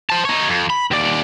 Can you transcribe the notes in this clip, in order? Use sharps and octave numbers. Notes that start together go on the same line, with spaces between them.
C5 A5
D#4 C#5
F2
B5
D#2 D5